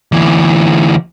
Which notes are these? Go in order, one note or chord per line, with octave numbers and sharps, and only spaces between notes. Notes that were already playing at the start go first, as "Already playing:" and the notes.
D2 E3